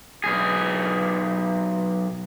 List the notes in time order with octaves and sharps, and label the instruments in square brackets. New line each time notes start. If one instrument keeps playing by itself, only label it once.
[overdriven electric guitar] B1 G#4